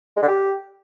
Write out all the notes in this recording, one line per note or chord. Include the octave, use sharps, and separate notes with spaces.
G#3
D3
G4